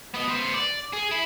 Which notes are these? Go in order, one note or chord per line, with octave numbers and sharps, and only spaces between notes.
B3 D#5
B3 C5
D5
G#4
E4